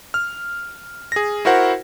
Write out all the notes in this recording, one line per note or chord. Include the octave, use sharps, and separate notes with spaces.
F6
G#4 A#6
E4 F#4 A#4 C5 F#5